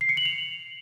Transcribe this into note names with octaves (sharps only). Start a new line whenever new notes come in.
C7
C#7
F#7
F7